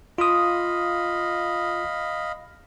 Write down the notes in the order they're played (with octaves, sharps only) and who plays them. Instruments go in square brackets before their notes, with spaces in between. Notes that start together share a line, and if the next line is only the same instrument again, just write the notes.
[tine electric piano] F4 D#6 [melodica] D#5 F5 B5